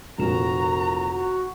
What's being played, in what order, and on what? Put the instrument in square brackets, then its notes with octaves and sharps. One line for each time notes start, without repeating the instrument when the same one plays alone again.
[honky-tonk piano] F1 A#2 E7 [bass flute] F#4 [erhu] A#5
[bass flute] F#4